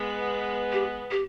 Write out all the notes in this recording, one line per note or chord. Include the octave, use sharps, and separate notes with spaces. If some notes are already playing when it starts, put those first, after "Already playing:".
Already playing: G#3 B3
G4
G4